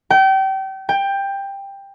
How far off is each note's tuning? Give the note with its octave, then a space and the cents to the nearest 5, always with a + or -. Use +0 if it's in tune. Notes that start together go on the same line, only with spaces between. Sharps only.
G5 -30
G5 +15